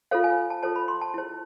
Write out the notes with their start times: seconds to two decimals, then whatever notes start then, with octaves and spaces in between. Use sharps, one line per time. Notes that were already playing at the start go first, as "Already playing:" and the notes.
0.11 F4 A4 C5 F5
0.24 G#5
0.50 A5
0.62 F4 A4 C5 A5
0.76 B5
0.88 C6
1.01 A5
1.14 E4 G#4 C5